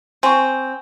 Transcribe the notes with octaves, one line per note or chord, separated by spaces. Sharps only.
C4 G#5 C#6